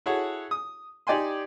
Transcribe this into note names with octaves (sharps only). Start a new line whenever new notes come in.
E4 F#4 G#4 A4 C#5 F#5
D#6
D#4 G4 D5 G5 G#5 C6